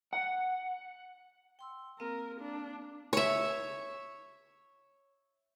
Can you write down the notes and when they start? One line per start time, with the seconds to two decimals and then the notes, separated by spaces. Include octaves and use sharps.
0.13 F#5
1.59 G5 C6 E6
2.00 A#3 C4 A#4 F5
2.41 D4
3.13 C#5 E5